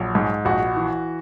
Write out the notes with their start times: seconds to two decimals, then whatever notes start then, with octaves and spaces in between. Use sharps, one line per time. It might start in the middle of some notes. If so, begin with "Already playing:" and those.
Already playing: A#1 F#3
0.15 G#2
0.45 A#1 F#4
0.76 E3